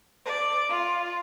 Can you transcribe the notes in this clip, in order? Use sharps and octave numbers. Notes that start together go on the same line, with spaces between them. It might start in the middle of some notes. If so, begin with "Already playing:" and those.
D5
F4